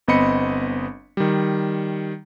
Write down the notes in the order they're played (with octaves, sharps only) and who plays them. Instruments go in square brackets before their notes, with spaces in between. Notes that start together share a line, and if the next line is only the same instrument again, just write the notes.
[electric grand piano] G1 B3 C4 D#5 B5 C#7
D#3 G3